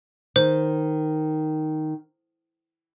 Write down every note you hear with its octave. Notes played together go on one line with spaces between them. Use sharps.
D#3 C5